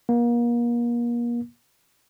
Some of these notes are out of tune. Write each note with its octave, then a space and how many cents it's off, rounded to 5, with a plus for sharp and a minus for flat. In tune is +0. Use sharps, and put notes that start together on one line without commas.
A#3 +35